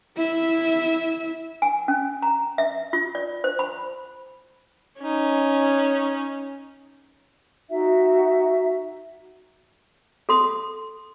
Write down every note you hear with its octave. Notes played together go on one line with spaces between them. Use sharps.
E4 E5
G#5
C#4
A#5
E5
F4
D5
C5
B5
C#4 D#4
D#4 F#4 E5
A4 C6 D#6